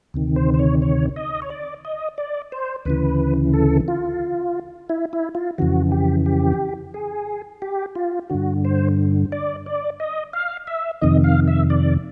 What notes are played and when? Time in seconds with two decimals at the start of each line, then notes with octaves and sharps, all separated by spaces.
0.14 D2 C3 D#3
0.36 C5
0.54 C5
0.59 C#5
0.82 C#5
1.16 D#5
1.42 C#5
1.50 D5
1.85 D#5
2.18 D5
2.52 C5
2.85 D2 C#3 E3 B4
3.53 A4
3.88 F4
4.89 E4
5.13 E4
5.35 F4
5.58 F2 C#3 E3 F#4
5.92 G4
6.26 G4
6.94 G#4
7.62 G4
7.95 F4
8.30 G2 D3 F#4
8.65 C5
9.32 D5
9.66 D5
10.00 D#5
10.33 F5
10.67 E5
11.01 F2 C3 D#3 D#5
11.24 F5
11.48 E5
11.70 D5